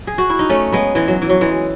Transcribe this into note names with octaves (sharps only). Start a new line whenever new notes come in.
G#4
F#4
E4
D#4
A3 C#4
G#3 B3
E3 G#3
F#3
E3
F#3
E3 G#3